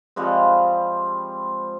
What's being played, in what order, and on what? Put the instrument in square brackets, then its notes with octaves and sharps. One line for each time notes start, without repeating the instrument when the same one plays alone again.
[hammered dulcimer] F3 G3 G#3 C4